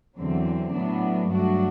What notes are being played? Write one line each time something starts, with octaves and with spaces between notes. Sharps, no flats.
E2 D3 F#3 C4
A2 F#3 B3 D4
G2 F#3 A3 D4 F#4